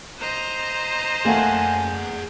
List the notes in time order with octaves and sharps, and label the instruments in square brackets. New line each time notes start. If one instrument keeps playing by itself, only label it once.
[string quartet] C5 D#5 A#5
[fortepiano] A3 A#3 [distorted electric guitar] G#4 F#5 [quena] G#5